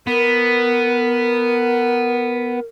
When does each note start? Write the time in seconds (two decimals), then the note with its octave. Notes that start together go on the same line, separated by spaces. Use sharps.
0.07 B3 A#4